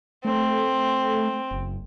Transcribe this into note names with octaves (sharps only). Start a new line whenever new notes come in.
A3 C4
F#1